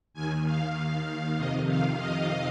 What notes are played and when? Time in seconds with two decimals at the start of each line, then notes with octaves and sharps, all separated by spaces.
0.14 D#2 D#3 G#5
0.45 F5
1.36 F2 C3 D#3 D#5
1.68 F5
1.98 D#5